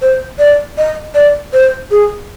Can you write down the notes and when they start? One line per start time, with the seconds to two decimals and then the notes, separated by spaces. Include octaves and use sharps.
0.02 C5
0.39 D5
0.78 D#5
1.15 D5
1.53 C5
1.91 G#4